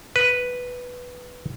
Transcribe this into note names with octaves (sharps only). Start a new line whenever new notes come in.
B4